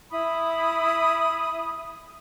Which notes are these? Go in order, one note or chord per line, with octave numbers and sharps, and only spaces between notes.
E4 B5 D#6